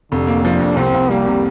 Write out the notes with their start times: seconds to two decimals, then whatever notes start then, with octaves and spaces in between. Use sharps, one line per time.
0.12 F1 D3
0.27 A#3
0.44 F3 D4
0.60 F2
0.77 C2 C4
0.94 C2
1.10 G3 A#3
1.26 C3